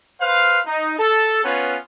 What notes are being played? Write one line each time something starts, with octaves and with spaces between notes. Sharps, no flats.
B4 C5 F5
D#4
A4
B3 C#4 F4 B4 C#5